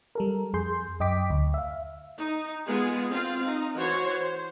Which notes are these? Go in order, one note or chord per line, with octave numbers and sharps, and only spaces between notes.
G3 A4 A#4
F2 G#4 C6 G6
F#2 D#5 G5 D6 B6
D2
E5 F5
D#4
G#3 B3 F4 G#4
C4 F4 F5
D#4
E3 F#4 C5 C#5
C5